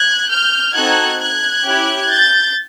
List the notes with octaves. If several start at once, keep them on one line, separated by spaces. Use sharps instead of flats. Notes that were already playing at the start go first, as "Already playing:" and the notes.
Already playing: F#6 G#6
F6 G6
C4 D#4 F#4 A4 F#6 G#6
F#6 G#6
C#4 E4 G4
G6 A6